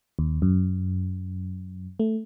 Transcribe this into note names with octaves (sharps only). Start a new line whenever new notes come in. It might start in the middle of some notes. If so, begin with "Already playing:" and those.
D#2
F#2
A3